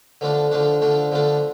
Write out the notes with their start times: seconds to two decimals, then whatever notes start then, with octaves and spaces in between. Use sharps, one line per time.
0.21 D3 F3 A3 D4
0.52 D3 F3 A3 D4
0.82 D3 F3 A3 D4
1.12 D3 F3 A3 D4